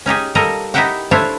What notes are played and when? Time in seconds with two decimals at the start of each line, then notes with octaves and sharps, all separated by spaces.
0.06 C#4 D#4 G4 G#4
0.35 G3 A#3 A4 A#4 D#5
0.74 D#4 E4 G4 E5 F#5 G5
1.11 A3 D4 E4 F4 C5 C#5